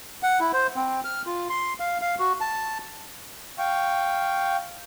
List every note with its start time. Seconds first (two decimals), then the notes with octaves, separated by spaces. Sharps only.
0.23 F#5
0.40 E4
0.53 C5
0.76 C4
1.04 F6
1.26 F4
1.50 C6
1.80 F5
2.01 F5
2.19 F#4
2.41 A5
3.58 F5 G5 C#6